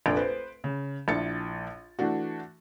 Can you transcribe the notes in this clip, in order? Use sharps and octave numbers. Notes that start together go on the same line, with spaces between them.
F1 A#1 D4 D7
B4 C5
C#3
A#1 D4 E4 A6 C#7
E3 A3 D4 F#4